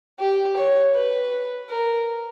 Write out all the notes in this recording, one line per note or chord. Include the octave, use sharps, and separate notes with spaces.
G4
C#5
B4
A#4